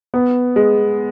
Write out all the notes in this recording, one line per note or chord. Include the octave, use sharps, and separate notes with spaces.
B3
G#3